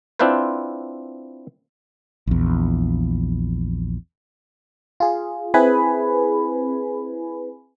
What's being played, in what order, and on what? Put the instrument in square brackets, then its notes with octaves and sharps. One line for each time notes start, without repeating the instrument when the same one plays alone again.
[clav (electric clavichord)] C4 D4 E4 F4 B4 C5
[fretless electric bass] A#1 E2
[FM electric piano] F4 G#4
C4 E4 G#4 B4 G#5 B5